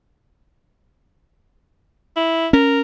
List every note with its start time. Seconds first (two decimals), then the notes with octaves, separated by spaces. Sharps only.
2.16 E4
2.53 C#4 A#4